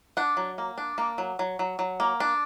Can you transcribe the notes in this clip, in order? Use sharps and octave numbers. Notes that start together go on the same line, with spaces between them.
D4 F#5
F#3
A#3
D4
A#3
F#3
F#3
F#3
F#3
A#3
D4